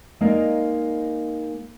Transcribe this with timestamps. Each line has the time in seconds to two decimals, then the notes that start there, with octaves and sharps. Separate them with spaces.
0.21 G#3 A#3 D#4 D5 F5